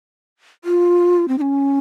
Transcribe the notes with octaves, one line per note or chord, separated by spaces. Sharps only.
F4
C4
D#4
C#4